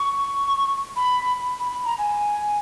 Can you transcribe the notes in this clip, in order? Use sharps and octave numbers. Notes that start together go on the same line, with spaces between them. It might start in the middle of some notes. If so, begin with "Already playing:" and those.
Already playing: C#6
B5
B5
B5
A#5
G#5